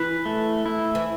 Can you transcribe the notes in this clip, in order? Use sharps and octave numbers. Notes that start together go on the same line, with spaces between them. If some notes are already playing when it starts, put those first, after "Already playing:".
Already playing: E3 B4
A3
E4
E3